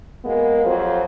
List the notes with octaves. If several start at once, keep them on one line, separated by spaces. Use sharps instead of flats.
G#3 A#3 B3 F#4 A#4
F2 F#3 F4 G4 C5